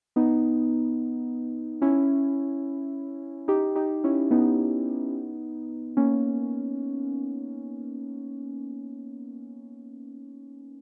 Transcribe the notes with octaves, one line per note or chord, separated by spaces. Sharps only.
B3 D#4
C#4 E4
D#4 G4
D#4 G4
C#4 E4
B3 D#4
A#3 C#4